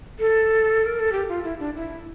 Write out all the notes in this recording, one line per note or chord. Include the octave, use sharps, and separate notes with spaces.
A4
A#4
A4
G4
F4
E4
D4
E4